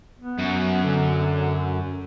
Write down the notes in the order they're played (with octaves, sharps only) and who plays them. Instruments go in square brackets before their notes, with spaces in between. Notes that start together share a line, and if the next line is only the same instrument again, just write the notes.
[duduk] B3
[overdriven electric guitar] F#2
[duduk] D3